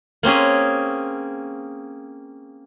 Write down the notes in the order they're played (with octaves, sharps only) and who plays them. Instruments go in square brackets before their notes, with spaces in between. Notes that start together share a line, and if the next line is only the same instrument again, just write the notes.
[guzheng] A#3 C4 C#4 G#4